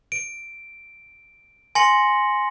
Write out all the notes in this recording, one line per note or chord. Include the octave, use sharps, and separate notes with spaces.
D7
G#5 C6 A#6 C#7 F#7